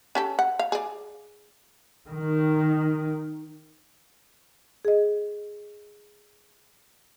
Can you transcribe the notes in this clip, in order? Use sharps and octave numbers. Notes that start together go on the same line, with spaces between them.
C#4 G4 A4
F#5
F5
G#4 D5
D#3
G#4 D#5